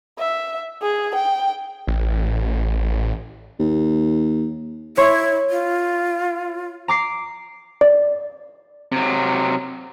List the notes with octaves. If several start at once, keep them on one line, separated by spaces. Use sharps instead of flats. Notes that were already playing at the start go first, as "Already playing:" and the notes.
E5
G#4
G5
A1
D#2
E4 C#5 C6 C#6
F4
A#5 D6 C7
D5
C3 F#3